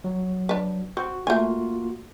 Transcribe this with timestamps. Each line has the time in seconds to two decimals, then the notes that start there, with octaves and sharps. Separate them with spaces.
0.04 F#3
0.49 D4 B4
0.97 C4 F#4
1.27 A3 A#3 F4 F#4 G#5